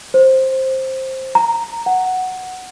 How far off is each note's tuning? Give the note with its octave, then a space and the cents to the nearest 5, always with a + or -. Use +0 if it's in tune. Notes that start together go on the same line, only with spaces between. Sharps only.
C5 +10
A#5 -10
F#5 +5